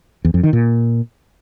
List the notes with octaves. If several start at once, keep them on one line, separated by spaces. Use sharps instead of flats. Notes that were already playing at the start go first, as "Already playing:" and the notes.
E2
F2
D#3
A#2